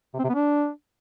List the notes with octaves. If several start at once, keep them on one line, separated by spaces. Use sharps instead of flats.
C3
C4
C3
B3
D4